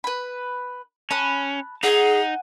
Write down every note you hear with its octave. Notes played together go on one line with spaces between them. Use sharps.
B4 B5
C#4 A5 B5 F#6
D#4 G#4 F#5 G#5